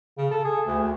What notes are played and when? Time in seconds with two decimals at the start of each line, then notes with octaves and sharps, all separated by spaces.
0.18 C#3
0.31 A4
0.45 G#4
0.67 D2
0.82 D2